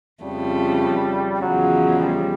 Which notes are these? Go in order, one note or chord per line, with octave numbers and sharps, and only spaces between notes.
F2 C#3 F3 G3 A3
E2 C#3 F3 F#3 G#3
G3